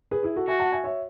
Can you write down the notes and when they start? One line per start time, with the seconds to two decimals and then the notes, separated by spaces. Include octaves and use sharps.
0.11 G#4 B4
0.23 E4 G#4
0.36 F#4 A4
0.47 F#4 E5 G#5
0.59 F#5 A5
0.72 E5 G#5
0.84 C#5 E5